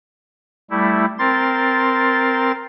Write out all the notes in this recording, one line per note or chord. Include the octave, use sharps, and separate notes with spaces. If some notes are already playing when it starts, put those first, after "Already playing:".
G3 A3 E4
C4 A#4 C6 A6